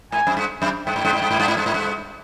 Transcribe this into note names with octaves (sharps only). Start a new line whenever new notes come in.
G#2 G#5
F#2
G2
F#2
G2 G5
G#2
G2
G#2
G2
G#2
G2
G#2
G2
G#2
G2